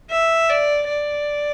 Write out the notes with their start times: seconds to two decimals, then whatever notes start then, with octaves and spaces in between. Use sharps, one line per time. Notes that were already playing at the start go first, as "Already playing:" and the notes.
0.11 E5
0.50 D5
0.88 D5